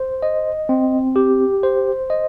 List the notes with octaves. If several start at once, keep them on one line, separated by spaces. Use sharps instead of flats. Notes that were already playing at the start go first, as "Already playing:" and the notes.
Already playing: C5
D#5
C4
G4
C5
D#5